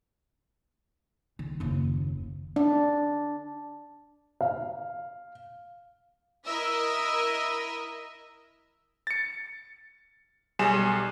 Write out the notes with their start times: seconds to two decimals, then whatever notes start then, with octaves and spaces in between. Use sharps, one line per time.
1.39 D#3
1.60 F#1 D#2
2.56 D4
4.41 F5
6.46 E4 A#4 D#5 E5
9.07 A6 C#7
10.59 B1 G3 G#4 G#5 E7